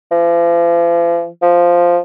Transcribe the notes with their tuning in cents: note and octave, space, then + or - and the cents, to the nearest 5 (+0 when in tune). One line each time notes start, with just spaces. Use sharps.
F3 -40
F3 +0